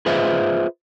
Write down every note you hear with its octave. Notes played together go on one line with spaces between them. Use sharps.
F4 G#4 B4 C5 D#5 E5